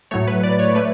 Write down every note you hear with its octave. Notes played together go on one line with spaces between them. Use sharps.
A2 F#3 A3 C#5
B4
D5
C#5
A3 B4